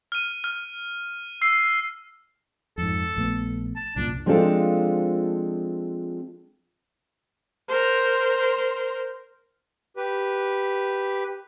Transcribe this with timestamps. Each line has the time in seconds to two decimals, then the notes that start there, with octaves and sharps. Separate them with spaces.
0.12 F6 D#7
0.44 F6
1.41 E6 C7
2.78 F2 G#2 A4
3.16 A#1 A3 B3
3.76 A5
3.96 C2 F#2 A#2 D4
4.26 F3 G#3 C4 D4 F4 A4
7.68 A#4 C5
9.97 G4 B4